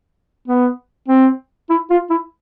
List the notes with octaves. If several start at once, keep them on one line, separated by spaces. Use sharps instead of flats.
B3
C4
E4
F4
E4